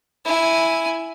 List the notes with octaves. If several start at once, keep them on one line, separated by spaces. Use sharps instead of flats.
E4 G#5